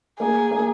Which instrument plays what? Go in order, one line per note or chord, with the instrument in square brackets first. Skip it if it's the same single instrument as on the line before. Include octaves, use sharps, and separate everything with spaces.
[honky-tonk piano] A#3 [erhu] G#4
[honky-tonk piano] A#3